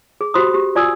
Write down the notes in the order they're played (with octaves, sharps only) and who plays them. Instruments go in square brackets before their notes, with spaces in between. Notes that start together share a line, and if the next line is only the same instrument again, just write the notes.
[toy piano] G#4
F#4 G4 C5 B5 C6 D#6
G4
F4 D5 G#5 D#6 E6